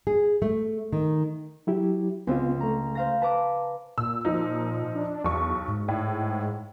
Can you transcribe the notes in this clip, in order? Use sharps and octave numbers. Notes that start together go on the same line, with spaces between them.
G#4
A3
D#3
F#3 E4 G4
C#2 B3 C4 F4
A3 A#5
C5 F5 A#6
B4 A5 A#5 D6
A#2 E6
F3 D#4
D4
B1 E2 C#6
G#2
A2